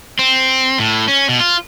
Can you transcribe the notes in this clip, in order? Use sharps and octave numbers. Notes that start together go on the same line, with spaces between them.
C4
A2
C#4
B2
F4